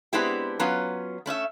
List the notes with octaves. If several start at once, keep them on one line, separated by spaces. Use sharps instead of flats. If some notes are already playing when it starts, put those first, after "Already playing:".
G#3 B3 C4 D4 E4 G4
F#3 B3 C#4 F4
A3 C#4 D#5 E5